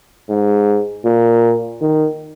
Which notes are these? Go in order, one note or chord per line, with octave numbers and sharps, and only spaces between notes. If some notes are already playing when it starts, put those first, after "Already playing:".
G#2
A#2
D#3